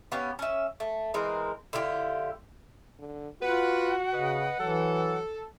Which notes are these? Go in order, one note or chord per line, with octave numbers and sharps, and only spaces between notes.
B3 C#4 G4 F5
C#4 E5
A3
E3 G#3 C4 A#4
D3 E4 F4 G4
D3
F4 F#4 B4 F#5
C#3 B4 D#5
E3 F#3 A4